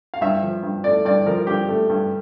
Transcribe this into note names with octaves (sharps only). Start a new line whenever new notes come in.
F5
G2 E5
F3
G2
A3 D5
G2 D5
F3 A#4
G2 G4
A3
G2